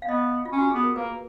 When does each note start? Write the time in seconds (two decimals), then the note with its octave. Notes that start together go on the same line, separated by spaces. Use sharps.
0.02 F5
0.09 B3 D#5
0.45 F4
0.52 C#4
0.58 F#4
0.71 B3 G#4
0.83 A#4
0.96 A#3 B4